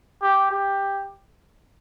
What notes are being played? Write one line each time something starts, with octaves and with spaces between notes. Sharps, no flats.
G4
G4